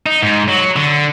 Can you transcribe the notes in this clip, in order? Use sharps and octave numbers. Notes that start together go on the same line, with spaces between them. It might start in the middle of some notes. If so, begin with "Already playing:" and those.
D#4
G#2
F#3
D3